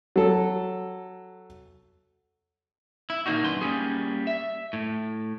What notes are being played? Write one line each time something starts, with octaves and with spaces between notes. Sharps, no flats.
F#3 A4
E4
A#2 D#3 A#3 D4 D#4 F#4
F#2 B4 C6
G3 A#3 C#4 G#4
E5
A2